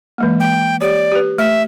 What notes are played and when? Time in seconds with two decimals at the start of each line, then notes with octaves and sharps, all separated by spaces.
0.18 E3 G#3 A#3
0.40 G5
0.81 G4 C#5 D5
1.12 G4 B4
1.38 A3 E5